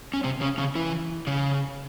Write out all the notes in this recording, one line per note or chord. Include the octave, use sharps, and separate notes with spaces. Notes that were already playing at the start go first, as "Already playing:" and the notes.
C#4
C3 C4
C#3 C#4
C#3 C#4
E3 E4
C#3 C#4